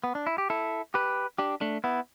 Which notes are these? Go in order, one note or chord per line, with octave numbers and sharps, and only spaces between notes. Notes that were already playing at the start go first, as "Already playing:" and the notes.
B3
D4
E4
G4
E4 A4
G4 B4
D4 G4
A3 D4
B3 E4